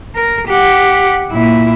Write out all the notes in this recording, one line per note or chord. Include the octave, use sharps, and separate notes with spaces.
A#4
G4 F#5
A#2 E4